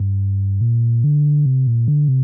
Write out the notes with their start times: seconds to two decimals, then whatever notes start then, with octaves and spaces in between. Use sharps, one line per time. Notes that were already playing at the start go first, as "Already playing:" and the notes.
Already playing: G2
0.61 A#2
1.04 D3
1.46 C3
1.67 A#2
1.88 D3
2.08 C3